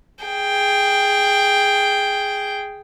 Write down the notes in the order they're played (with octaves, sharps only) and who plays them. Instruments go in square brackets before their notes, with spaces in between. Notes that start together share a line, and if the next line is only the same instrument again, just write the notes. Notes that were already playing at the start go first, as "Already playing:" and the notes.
[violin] G#4 G5